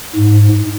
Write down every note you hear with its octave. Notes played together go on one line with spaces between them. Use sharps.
G#2